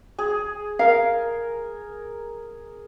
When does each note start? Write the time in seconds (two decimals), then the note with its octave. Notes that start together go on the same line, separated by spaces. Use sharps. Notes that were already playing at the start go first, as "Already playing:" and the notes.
0.19 G#4
0.79 A#4 F5